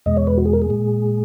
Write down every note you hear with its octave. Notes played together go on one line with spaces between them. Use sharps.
E2 B2 G#3 D#5
C#5
B4
F#4
G#4
A#4
G#4
A#2 G#3